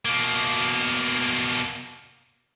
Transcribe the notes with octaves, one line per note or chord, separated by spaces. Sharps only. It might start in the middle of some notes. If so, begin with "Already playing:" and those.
B2 A#3